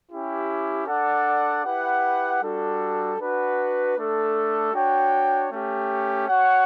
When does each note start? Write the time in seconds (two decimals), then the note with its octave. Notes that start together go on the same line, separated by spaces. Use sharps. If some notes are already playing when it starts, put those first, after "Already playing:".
0.10 C#4 E4 G4
0.87 D4 A4 D5 F#5
1.65 E4 G4 B4 F#5
2.42 G3 D4 F#4 A4
3.19 D4 F#4 B4 F#5
3.96 A3 D4 A4
4.73 D4 F#4 C#5 G5
5.50 A3 C#4 G4
6.27 F#4 C#5 F#5